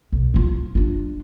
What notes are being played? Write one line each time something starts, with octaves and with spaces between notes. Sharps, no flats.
B1
E4 F4
D4 F4